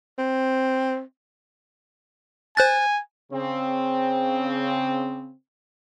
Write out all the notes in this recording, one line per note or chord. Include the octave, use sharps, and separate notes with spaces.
C4
C5 G#5 F#6 A6
C#3 C4